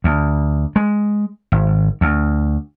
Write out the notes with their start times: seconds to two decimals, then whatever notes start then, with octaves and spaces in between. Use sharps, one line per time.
0.04 D2
0.76 G#3
1.52 G#1
2.01 D2